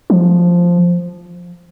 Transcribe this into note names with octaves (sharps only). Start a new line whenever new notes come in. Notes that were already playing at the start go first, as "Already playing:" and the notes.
F3